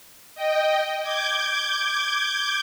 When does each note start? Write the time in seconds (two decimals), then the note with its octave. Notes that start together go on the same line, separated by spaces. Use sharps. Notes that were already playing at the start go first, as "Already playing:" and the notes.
0.35 D#5 G5
1.03 D6 G6 G#6